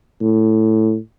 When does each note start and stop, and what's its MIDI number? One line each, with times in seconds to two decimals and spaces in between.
0.21 0.97 45